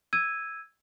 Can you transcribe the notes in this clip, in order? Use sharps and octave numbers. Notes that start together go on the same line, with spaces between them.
E6 G#6 D#7